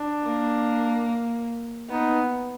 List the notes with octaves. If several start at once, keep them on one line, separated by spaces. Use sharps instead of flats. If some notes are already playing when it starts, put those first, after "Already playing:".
Already playing: D4
A#3
B3 D#4